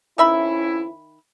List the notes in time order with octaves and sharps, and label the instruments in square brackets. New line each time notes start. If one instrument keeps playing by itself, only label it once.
[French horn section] F2 C#4 E4 [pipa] D#3 E5 B5